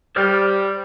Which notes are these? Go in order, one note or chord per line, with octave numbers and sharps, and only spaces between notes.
G3 C5 D5 F6